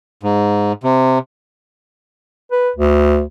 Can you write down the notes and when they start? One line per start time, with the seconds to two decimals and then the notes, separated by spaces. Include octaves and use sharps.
0.23 G#2
0.84 C3
2.52 B4
2.77 D2